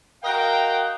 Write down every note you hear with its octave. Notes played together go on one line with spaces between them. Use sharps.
F#4 A#4 D#5 F5 G5